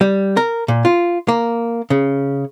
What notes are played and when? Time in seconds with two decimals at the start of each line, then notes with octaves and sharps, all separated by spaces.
0.01 G3
0.37 A#4
0.68 A#2
0.85 F4
1.28 A#3
1.90 C#3